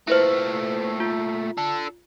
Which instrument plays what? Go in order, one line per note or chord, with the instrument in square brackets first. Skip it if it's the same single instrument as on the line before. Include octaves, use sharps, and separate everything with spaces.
[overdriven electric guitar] A#2 A3 [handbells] E4 B4 C5
[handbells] F4
[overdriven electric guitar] D4 A4